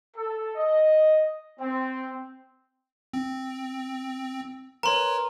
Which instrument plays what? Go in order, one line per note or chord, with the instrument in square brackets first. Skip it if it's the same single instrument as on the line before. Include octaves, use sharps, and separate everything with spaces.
[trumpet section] A4
D#5
C4
[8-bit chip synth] C4
[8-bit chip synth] A#4 B4 C#5 [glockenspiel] A#5 C6